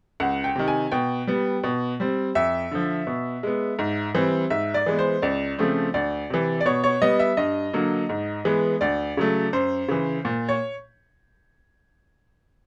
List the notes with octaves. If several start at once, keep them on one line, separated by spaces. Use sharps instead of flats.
C#2 F#5
G5
C3 D#3
G#5
B2 G5
G3 B3
B2
G3 C4
F2 E5
D3 F3
B2
G#3 B3
G#2
E3 G3 C4
G#2 E5
D5
E3 G#3 B3
C5
C#2 D5
C#3 F3 A3 C4
D2 D5
C3 E3
D5
B2 C#5
C#5
G3 B3 D#5
E5
G2 D#5
D3 F#3 A#3
G#2
E3 G#3 B3
D2 D5
C#3 F#3 A3
F#2 C5
C#3 E3
A#2
C#5